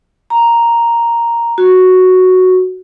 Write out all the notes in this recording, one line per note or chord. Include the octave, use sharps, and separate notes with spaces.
A#5
F#4